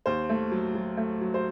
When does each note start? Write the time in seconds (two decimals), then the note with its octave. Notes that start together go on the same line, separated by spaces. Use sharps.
0.06 D#2 C5
0.30 A3
0.51 F#3
0.75 F#3
0.97 A3
1.21 F#3
1.34 C5